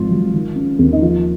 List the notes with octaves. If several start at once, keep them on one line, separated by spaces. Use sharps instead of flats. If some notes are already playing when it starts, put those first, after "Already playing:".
Already playing: G#1 G#2 F3 F4
F#3
D#3
C#4
D#2
D#4
F3 F4